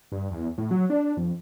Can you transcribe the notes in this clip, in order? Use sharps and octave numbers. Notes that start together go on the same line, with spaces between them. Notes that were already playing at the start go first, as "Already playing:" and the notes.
G2
E2
A2
F#3
D4
F2